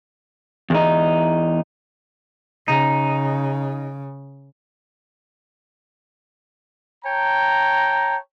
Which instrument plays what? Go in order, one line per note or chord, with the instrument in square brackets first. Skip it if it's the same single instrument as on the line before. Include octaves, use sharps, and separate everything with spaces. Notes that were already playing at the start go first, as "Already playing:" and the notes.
[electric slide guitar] E2 D#4
[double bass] C#3 [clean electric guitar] D#4
[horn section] C#5 G5 A5 A#5